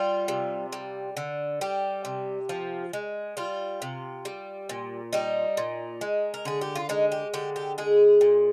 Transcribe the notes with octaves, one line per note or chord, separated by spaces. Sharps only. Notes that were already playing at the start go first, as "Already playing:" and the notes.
Already playing: G3 F4
C3
G3
D3
G3 G4
C3
F3
G#3
G3 F4
C3
G3
A#2
G3 D#4
A#2
G#3
A#4
D3 G#4
G4
F4
G#3 D#4
G4
D3 G4
G4
G#3 G#4
A#2